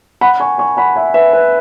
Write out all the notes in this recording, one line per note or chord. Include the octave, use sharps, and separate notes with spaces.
F#5 B5
G#5 C#6
G#5 C#6
F#5 B5
E5 G#5
B4 E5
B4